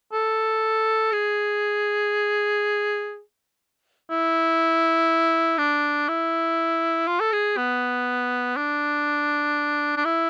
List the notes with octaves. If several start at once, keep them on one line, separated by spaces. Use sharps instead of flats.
A4
G#4
E4
D4
E4
F4
A4
G#4
B3
D4
D4
E4